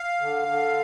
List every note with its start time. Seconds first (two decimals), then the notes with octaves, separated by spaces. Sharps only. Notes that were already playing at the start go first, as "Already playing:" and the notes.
Already playing: F5
0.21 D3
0.48 D3